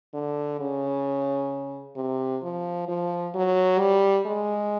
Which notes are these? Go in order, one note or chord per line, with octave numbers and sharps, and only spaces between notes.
D3
C#3
C3
F3
F3
F#3
G3
G#3